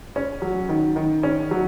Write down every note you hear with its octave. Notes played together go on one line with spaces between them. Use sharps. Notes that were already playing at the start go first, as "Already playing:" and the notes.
C#4
F#3
D#3
D#3
C#4
F#3